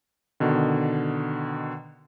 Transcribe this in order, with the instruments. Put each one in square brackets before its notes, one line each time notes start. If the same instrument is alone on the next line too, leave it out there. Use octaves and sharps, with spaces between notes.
[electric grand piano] B2 D3 D#3